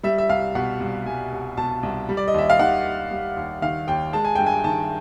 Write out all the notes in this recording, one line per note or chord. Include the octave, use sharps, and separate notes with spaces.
G3 E5
E5
C2 F5
B2 F#5
C2
G3 G#5
C2
B2 A5
C2
G3
D5
D#5
D#2 E5
F5
D#3 F#5
D#2
G3
D#2
D#3 F5
D#2 G5
G#3 A5
G#5
G2 G5
G#5
D#3 A5